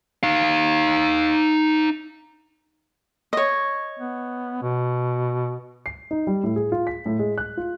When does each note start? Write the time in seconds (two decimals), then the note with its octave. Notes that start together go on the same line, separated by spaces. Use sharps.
0.23 D#4 F5
3.33 C#5 D#5
3.99 B3
4.63 B2
5.86 C7
6.11 D#4
6.27 G3
6.44 A2
6.56 G#4
6.72 F4
6.87 B6
7.06 A2
7.19 G#3
7.38 F#6
7.57 F4